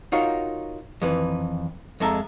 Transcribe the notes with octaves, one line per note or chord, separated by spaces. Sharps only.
D#4 F4 F#4 A#4 C#5 F5
F2 D#3 E3 B4
F2 G#3 A4 E5 A#5